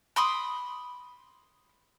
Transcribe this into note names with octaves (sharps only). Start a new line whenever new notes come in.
B5 C6 D6 D#6